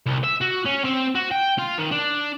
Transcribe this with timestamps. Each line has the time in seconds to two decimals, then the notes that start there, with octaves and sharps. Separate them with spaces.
0.06 C2
0.24 E5
0.41 F#4
0.65 C#4
0.84 C4
1.15 F#4
1.31 G5
1.58 F4
1.78 D#3
1.91 D4